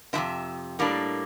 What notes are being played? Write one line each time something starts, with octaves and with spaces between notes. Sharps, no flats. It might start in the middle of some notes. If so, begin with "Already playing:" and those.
F2 C3 F3 C4 E5
A2 G3 A#3 D4